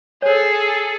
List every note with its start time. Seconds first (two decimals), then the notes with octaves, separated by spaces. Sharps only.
0.22 G#4 A4 C5 C#5